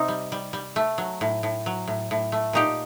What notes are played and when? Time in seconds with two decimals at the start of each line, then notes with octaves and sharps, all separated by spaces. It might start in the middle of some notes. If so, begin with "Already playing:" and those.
Already playing: C3 C4 D#4
0.08 G3
0.32 G3
0.53 G3
0.76 A3
0.98 F#3
1.21 A2
1.43 A2
1.66 F#3
1.88 A2
2.11 A2
2.32 A3
2.53 A#2 D#4 G4